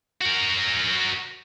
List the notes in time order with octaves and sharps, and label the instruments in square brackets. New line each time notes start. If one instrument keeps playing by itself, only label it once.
[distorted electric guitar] F#4 A#4